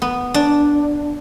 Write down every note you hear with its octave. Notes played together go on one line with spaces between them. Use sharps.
B3
D4